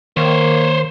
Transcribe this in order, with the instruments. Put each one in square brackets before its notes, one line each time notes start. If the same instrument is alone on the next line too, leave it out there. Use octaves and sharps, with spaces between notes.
[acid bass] D#3 [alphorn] A#3 [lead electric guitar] C5 C#5